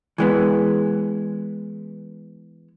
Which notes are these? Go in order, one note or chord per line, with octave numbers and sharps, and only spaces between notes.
E3 G#3 B3